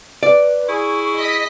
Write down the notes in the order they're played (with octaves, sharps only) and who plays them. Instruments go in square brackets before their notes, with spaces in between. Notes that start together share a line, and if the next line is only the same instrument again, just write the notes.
[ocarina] B4 [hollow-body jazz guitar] D5
[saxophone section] E4 G#4 [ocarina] C#6
[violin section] D#5 B6